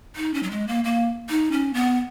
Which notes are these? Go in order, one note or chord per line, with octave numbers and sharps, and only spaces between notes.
D#4
C#4
F#3
G#3
A#3
A#3
D#4
C#4
B3